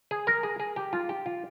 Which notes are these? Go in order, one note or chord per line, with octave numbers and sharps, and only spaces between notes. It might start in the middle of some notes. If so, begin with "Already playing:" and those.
G#4
A#4
G#4
G#4
G4
F4
G4
F4